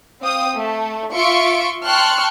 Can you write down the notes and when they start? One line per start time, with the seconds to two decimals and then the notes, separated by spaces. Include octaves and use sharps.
0.21 C4 F5 G5 D#6
0.56 A3
1.14 F4 E5 C6 C#6 D7
1.85 G5 A5 C6 C#6 F6 F#6